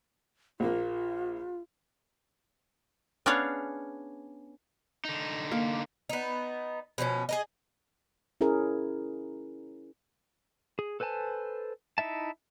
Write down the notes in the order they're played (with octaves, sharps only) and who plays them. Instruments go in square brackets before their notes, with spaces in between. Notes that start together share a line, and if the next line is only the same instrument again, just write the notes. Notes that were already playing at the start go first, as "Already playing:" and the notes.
[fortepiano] A#1 A#3 [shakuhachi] F4
[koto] B3 C#4 D4 G#4 C#5 F5
[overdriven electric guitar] D3 D#4
[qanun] A#3
[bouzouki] B3 D#4
B2 F3 C4 C#4
G#4 A#4 D#5
[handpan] C#4 E4 G#4 A#4
[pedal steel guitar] G#4
A4 B4 C5 G#5 A5
D#4 E4 E5 A5